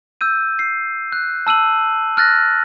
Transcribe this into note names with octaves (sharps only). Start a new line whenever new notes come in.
E6 G6 D#7
C7
F#6
A5 E6 D#7 F#7
F6 F#6 A6 A#6